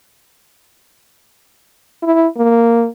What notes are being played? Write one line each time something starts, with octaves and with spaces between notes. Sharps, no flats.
E4
A#3